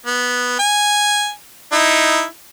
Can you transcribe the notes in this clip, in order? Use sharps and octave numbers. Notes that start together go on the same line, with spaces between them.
B3
G#5
D#4 E4